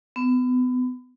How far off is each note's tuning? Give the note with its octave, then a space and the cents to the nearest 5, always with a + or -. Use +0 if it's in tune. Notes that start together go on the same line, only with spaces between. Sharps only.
B3 +30